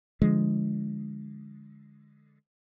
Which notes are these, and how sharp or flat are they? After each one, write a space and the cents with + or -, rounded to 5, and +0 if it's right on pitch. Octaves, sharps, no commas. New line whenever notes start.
D3 +0 F3 -15 G#3 +0